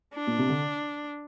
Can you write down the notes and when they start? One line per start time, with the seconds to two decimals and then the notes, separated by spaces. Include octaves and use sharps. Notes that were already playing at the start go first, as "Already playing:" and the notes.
0.14 D4
0.27 A#2
0.38 C3
0.49 D3